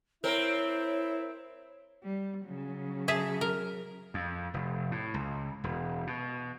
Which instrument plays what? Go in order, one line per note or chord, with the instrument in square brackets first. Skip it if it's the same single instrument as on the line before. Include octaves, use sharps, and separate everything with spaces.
[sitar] C4 A#4 [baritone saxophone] E4 [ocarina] C#5
[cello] G3
C#3 F#3
[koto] G#4 E5 A5
A#4
[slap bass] F2
F1
A2
C#2
E1
B2